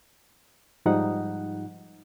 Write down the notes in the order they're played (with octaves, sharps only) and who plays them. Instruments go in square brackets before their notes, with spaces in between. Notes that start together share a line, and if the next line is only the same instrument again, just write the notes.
[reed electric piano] G#2 F3 G3 D#4 F#5